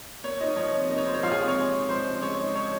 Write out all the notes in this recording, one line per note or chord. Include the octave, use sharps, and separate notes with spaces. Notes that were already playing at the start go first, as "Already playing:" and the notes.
A#3 C#5
D#4 F4 D#5
F3 C#5
C3
A#3 D#4 D#5
C#5
F4 C5
C#5
F3 F4 F5
G#4 G#5
C3
C#5 C#6
G#3
D#4
F3 C5 C6
C#3
G#3 C#5 C#6
D#4
F3 C#5 C#6